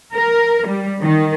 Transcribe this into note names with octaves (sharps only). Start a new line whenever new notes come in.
A#4
G3
D#3